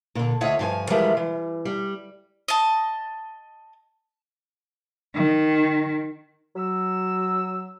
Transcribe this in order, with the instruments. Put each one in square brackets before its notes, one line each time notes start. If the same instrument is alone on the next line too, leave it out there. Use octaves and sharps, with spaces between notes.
[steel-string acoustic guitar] A#2 D3
D2 F4 C#5 D#5 E5 F#5
G2 F3 G#5
E3 F3 G3 G#3 A#4 E5
E3
G3
[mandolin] D#5 A5
[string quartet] D#3
[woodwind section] F#3 E6